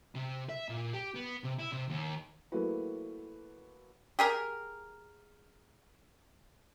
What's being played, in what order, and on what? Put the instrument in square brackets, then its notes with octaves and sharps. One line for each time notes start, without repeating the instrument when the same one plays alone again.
[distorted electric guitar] C3
E5
A#2
G4
B3
C3
E4
C3
D#2
[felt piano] F#3 A3 A#3 E4 F#4 B4
[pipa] G4 G#4 A#4